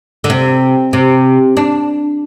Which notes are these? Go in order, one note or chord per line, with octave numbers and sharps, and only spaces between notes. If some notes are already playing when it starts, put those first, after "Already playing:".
D3
C3
C3
D4